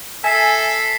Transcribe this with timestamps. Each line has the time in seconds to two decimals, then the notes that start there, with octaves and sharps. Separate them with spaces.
0.24 A4 E5 G#5 B6 C7